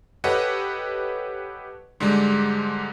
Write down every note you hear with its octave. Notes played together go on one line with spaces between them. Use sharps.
G4 A4 B4 C#5 D#5 F#5
G#2 D3 G3 G#3